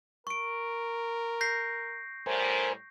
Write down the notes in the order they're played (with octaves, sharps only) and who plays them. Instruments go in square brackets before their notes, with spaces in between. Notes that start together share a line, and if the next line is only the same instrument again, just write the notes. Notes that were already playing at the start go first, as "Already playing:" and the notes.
[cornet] A#4 [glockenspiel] C#6 D7
[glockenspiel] G6 A#6 C7
[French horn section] A2 G3 [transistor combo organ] A#4 C5 G#5